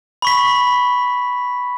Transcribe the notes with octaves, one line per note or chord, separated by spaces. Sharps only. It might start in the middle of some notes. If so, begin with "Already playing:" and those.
B5 C#6 B6